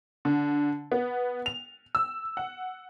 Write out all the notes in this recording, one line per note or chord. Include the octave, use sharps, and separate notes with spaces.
D3
B3
F7
E6
F#5